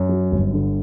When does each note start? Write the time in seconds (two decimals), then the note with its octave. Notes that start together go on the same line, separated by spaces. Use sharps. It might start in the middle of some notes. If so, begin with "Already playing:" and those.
Already playing: F#2
0.09 F#3
0.32 G1
0.53 D3